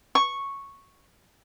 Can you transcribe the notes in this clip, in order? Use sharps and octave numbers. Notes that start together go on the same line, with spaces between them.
C#6